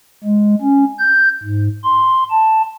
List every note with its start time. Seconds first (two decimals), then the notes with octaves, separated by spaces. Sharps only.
0.24 G#3
0.62 C#4
0.99 G6
1.44 G#2
1.84 C6
2.31 A5